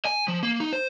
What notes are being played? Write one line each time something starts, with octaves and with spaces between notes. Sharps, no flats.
G#5
F3
A#3
D#4
C5